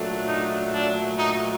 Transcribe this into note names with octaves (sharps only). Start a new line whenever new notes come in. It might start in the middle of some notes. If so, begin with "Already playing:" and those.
Already playing: A#2 F#3 A3 D4
D#4
D4
D#4